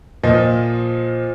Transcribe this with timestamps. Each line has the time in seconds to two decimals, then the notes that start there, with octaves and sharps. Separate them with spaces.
0.23 A#2 F3 D#5